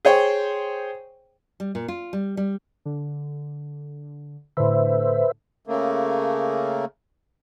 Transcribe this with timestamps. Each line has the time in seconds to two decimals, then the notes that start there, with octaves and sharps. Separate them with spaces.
0.05 G#4 C5 C#5 G5
1.60 G3
1.75 A#2
1.88 F4
2.13 G3
2.37 G3
2.85 D3
4.57 A2 D3 B4 C5 E5
5.67 C#3 A3 A#3